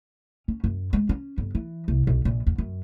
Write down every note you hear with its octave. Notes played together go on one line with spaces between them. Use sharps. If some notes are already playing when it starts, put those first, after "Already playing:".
C#4
F#2
G#3
C#4
G1
E3
C2
B1
A#1
E2
F#2